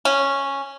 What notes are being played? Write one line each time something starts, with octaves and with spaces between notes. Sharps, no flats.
C#4